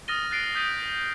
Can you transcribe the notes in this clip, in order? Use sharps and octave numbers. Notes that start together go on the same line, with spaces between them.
D#6 F6 A6 A#6 D#7 G7
F#6 A6 C7 D7
D#6 G6 A6 B6 D#7